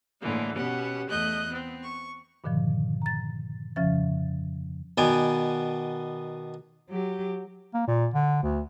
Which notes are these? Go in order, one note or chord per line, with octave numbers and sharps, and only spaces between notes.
A2 D3 E3 G#3 A#3
B2 B3 C#4 G4 F#5
E2 A3 D#5 F#6 G6
B3 C4
C#6
G2 A#2 D3 D#3 F3
A#5 A6
F2 C#3 F3 C#4 E5 A6
B2 D#3 B3 D5 G#5
F#3 G4
A#3
A#2
D3
D2